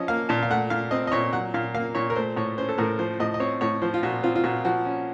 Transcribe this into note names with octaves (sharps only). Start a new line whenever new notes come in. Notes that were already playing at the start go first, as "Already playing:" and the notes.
Already playing: F3 C#4 D#5
A#3 F5
A#2 A5
F5
A3 F#5
A#2 F5
C4 D#5
D#5
A#2 C#5
F#3 F#5
A#2 F5
A#3 F5
A#2 C#5
A#4
A3 C5
A2 C#5
C#4 C5
A4
A2 A#4
F3 C5
A2 D#5
D#5
C4 C#5
A2 C#5
F3 C5
F4
A#2 F#4
C4 F4
F4
A#2 F#4
F3 F#4
C#4